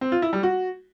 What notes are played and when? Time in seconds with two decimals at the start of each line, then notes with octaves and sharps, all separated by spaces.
0.01 C4
0.12 F4
0.22 E4
0.33 G3
0.43 F#4